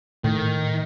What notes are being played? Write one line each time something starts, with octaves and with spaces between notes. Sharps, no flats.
A2 D#3